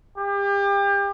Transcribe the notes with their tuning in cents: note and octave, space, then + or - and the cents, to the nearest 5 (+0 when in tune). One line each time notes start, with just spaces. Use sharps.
G4 +35